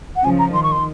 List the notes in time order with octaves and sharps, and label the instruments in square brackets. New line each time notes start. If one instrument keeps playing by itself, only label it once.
[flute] F#5
[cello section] C#3 F3 [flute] G#5
[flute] A#5
[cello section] D#3 [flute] C6
[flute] C#6
C6